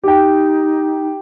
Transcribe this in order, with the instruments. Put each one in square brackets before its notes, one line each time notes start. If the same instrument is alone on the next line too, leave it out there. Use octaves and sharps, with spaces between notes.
[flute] D#4 [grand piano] G4 G5